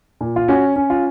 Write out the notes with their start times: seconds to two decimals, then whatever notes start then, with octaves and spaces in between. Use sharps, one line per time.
0.21 A#2
0.36 F4
0.48 C#4 F#4
0.76 C#4
0.90 F4